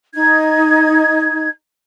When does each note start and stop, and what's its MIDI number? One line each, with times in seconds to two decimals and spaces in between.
0.14 1.49 63
0.14 1.49 92